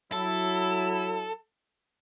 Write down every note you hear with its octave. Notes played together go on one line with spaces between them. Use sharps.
F#3 E4 A4